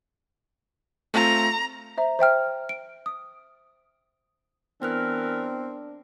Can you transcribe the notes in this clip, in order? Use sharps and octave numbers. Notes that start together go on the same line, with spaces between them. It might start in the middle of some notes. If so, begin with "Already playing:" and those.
A3 C4 F4 A#5
C5 E5 A#5
C5 E5 G5 F6
D7
D#6
E3 B3 C4 D4 A#4 F6 F#6